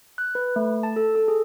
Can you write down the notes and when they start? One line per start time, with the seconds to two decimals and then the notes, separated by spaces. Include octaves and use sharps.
0.18 F#6
0.35 B4
0.56 A3
0.83 A5
0.96 A4
1.16 A4
1.28 G#4